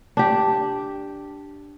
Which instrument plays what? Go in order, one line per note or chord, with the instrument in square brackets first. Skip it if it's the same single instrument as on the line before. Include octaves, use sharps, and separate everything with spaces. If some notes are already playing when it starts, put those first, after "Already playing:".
[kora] D4 G4